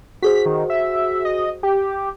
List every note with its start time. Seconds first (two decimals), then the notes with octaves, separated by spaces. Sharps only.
0.22 F#4 G#4 C5 B6
0.46 D#3
0.70 E5
1.25 D#5
1.63 G4